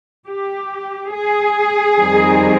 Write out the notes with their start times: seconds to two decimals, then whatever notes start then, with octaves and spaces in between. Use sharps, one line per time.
0.27 G4
1.13 G#4
1.98 F2 D#3 G3 C4 D#4